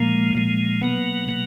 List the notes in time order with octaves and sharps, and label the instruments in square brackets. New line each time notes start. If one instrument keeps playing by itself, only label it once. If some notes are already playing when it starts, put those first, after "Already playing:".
Already playing: [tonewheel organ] A#2 F3 G#3 [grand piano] A#3
[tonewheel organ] A#2 F3 G#3
[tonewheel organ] B2 F#3 A#3 [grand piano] B3
[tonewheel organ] B2 F#3 A#3